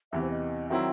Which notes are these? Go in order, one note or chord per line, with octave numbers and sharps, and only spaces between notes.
E2 C3 E3 E5
C5
D#5
D#3 F#3 C4 E4 E5